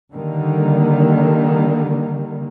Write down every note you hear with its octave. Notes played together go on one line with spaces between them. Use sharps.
D3 D#3 G3 A#3